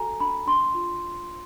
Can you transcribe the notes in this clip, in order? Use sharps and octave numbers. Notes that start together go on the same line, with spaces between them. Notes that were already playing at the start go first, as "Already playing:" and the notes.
Already playing: F#4 A4 G#5 A#5
D4 B5
D4 C6
F4